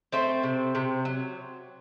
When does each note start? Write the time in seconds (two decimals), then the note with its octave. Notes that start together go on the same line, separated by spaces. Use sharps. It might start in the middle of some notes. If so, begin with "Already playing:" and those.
0.12 A3 C4 C5
0.43 C3
0.75 C3
1.05 F#3